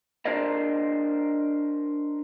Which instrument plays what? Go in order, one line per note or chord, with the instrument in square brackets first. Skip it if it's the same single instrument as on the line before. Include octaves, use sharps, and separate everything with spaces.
[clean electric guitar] D4 A#4 C5 D5 D#5